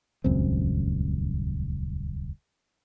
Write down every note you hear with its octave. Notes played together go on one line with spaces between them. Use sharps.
D#1 C#2 F#2 C4